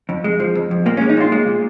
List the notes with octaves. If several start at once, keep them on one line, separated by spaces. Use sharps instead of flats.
F2
G#3
F3
F2
F2
A#2 A#3
C#4
G#3
D#4
A#2 F4
G#3
A#2